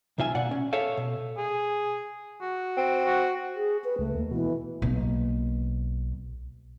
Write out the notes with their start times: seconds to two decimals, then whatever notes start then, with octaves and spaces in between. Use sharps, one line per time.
0.18 B1 C3 F4 E5 G#5
0.35 B2 A#3 D5 F#5
0.51 C#4
0.73 G4 A4 C#5 E5 F5
0.97 B2
1.38 G#4
2.41 F#4
2.77 C4
3.06 F#4
3.56 G#4
3.84 B4
3.99 C#2 A3
4.15 D#2
4.31 B2 E3
4.82 B1 A#3